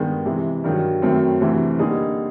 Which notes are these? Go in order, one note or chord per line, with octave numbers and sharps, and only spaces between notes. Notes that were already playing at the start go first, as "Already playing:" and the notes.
Already playing: G2 D#3 G#3 B3
C3 E3 G#3
G2 D#3 F#3
F#2 D#3 F#3 A3 C4
D2 C3 E3 A3 C4
D3 G3 A#3 D#4 G#4